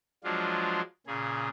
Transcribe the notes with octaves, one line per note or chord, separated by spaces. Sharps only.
F3 F#3 G#3 D4 F4
A#2 C#3 G#4